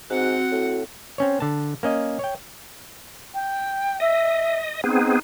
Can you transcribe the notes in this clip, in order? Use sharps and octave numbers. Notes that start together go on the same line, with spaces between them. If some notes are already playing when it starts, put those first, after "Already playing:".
G#2 C4 F#4 F#5
A2
C4 C#4 C#5
D3 A5
A#3 C#4 D#5
C#5 G5
G5
D#5 E5
B3 C4 D#4 G#4